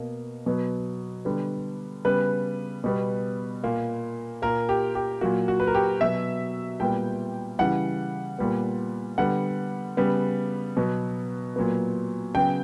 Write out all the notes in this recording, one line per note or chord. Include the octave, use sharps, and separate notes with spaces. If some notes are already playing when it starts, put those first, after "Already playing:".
Already playing: B2 A#3
B2 F#3 B3
D3 G3 B3
C#3 G3 B3 B4
B2 G3 B3
A#2 A#3
A#2 A#3 A#4
G4
G4
A#2 F#3 A#3 F#4
F#4
B4
A#4
G4
B2 F#3 B3 E5
A#2 G3 B3 G5
C#3 E3 G3 F#5
A#2 G3 B3
D3 G3 B3 F#5
C#3 G3 B3
B2 F#3 B3
A#2 F#3 B3
C#3 F#3 B3 G5